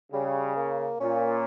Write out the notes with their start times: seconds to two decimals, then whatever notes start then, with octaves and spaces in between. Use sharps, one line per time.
0.12 C#3 G3
0.56 A#3
1.00 A#2 C#4